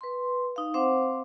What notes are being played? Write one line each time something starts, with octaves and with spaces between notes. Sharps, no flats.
B4 C6
D#4 F5
C4 C5 F5 F#5 D6